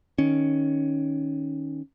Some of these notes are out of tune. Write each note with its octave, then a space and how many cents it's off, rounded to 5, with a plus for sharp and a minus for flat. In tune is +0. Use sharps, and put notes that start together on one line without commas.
D#3 +0 C#4 +0